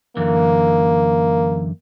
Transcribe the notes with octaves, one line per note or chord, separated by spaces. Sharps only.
F#2 D3 E3 A#3